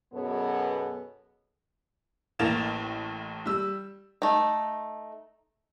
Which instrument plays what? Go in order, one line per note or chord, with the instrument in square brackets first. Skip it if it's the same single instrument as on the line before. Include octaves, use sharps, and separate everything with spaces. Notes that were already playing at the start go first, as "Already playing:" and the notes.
[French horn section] F#2 B2 B3 G#4 A4 C#5
[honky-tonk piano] A1 A2 A#3 A6 E7 F7
G3 E6
[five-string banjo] A3 D#4